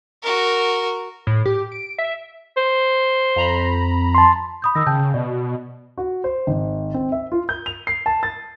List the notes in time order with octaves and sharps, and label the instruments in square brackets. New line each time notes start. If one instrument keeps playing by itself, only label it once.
[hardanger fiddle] F#4 A#4
[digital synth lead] A2
G4
D7
E5
[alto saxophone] C5
[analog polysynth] F2 A#5 B5
[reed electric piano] A5 C6
[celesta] B5 D#6 G6
[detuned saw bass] D#3 [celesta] D#6 E6 A#6
[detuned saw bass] C#3 [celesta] G5 A5 G6
[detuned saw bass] B2 [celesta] D5
[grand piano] F#4
C5
G#1
C4
E5
F4
G6
F7
C7
A5
A6